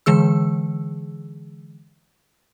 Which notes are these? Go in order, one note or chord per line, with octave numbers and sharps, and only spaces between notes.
D3 E3 G#3 G#4 E6